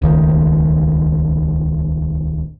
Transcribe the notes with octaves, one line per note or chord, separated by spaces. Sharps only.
D#1 C#2 D#3 A3